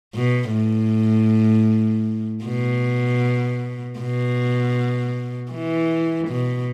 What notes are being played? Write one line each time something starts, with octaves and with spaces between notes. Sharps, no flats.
B2
A2
B2
B2
E3
B2